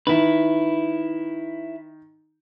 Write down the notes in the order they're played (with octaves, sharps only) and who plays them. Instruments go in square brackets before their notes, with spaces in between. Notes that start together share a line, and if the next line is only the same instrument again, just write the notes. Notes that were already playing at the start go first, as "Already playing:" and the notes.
[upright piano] D#3 [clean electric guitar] E4 B4